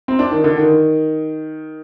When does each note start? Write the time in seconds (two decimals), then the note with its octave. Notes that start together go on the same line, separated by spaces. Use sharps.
0.08 C4
0.19 D4
0.31 D#3
0.44 D3
0.57 D#3